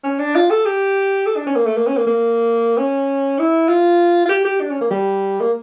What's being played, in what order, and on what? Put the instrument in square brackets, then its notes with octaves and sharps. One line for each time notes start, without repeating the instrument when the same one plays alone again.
[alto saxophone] C#4
D4
F4
A4
G4
A4
D4
C#4
A#3
A3
A#3
C#4
A#3
A#3
C#4
E4
F4
F4
G4
G4
D4
C#4
A#3
G3
A#3